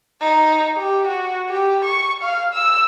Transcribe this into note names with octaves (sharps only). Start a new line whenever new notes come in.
D#4
G4
F#4
G4
C#6
F5
E6